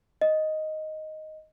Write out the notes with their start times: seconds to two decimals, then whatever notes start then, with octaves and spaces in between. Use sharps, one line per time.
0.21 D#5